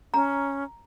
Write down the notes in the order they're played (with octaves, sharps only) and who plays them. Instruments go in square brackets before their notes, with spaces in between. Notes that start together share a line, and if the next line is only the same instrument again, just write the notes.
[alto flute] C#4 [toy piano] A#5